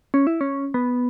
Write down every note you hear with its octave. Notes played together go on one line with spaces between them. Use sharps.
C#4
E4
C#4
B3